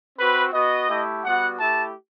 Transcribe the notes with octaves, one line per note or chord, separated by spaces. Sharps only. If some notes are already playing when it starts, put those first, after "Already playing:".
C4 F#4 B4
B3 F#4 D#5
A3 E4 G4
G3 B3 F#4 F#5
A3 E4 G4 A5